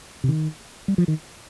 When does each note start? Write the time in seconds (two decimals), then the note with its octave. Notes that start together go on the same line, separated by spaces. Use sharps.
0.24 C3
0.28 D#3
0.88 G3
0.98 F3
1.08 D#3